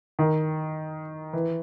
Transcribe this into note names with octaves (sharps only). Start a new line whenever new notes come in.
D#3
E3